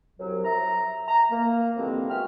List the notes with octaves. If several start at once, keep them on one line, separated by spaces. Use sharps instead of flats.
C2 F#2 F#3
E5 A#5
A#5
A#3
C2 D3 E3 F3 G#3 C4
F#4 G#4 E5 G5 F6